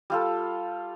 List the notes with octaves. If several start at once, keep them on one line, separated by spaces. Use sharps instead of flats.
G3 F4 A4